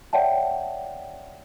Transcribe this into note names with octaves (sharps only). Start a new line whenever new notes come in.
C#5 D5 E5 F#5 G5 A5